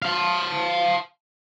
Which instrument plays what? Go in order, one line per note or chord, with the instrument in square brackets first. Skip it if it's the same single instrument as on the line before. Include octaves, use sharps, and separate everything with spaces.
[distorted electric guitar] F5 A5